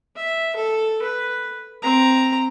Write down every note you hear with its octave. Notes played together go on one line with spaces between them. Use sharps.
E5
A4
B4
C4 A#5